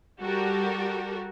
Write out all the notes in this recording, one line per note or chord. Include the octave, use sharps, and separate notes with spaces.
G3 F#4 G4 A4 A#4